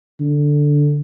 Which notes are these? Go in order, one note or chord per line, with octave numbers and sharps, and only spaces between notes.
D3